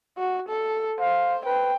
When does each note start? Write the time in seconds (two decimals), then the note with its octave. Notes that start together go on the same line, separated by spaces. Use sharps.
0.18 F#4
0.49 A4
1.00 C5 F5
1.46 B4 G5